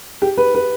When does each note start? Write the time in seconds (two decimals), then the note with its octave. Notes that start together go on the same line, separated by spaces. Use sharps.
0.22 G4
0.37 B4
0.55 B4